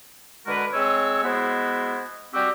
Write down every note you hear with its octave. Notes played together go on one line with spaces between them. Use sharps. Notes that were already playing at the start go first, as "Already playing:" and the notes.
D3 G#3 F#4 A#4 B4
G#3 C4 C#5 E6
G#3 B3 E4 F#4 C5
G3 C4 F#4 G4